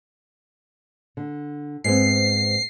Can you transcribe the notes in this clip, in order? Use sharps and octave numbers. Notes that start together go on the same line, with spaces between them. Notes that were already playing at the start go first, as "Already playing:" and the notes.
D3
G#2 B3 C4 C7